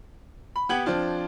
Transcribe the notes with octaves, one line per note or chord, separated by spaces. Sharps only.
B5
B3 G4 F#5 G#6 F#7
F3 C4 D4 F4